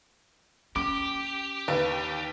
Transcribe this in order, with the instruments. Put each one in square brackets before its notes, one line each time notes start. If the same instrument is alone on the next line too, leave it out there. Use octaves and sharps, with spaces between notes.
[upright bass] C#4 [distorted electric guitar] G4 [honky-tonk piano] D6
[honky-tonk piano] D#2 [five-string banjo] B4